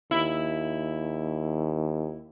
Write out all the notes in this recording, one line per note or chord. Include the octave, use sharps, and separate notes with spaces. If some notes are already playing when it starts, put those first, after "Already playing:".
D#2 E4